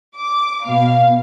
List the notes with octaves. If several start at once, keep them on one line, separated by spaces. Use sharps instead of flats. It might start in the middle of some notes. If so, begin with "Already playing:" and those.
D6
B2 F5